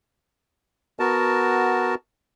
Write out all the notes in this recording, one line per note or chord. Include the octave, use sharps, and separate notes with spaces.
B3 F#4 A#4 A5